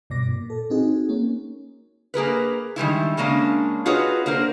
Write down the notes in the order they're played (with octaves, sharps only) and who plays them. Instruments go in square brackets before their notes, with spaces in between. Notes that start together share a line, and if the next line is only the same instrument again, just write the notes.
[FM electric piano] G2 B2 D5 D6 A#6
A#2
A4
C4 D#4 F#4 G#4
A#3 C#4
[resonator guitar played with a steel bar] A#3 G#4 A#4 B4
D#3 G3 G#3 E4
C#3 G#3 A#3 C#4 D4
F4 F#4 G#4 B4 C#5 D#5
A#3 D4 A#4 C5